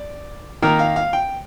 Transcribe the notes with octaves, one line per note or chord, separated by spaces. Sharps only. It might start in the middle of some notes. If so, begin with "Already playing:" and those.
Already playing: D5
D#3 A#3 A#4
F5
F5
G5